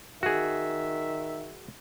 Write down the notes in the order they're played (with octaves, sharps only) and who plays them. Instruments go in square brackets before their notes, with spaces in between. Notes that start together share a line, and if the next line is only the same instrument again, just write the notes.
[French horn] D#3 [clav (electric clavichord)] F#4 G#4 [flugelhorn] E5